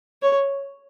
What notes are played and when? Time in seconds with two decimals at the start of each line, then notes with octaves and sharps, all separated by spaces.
0.22 C#5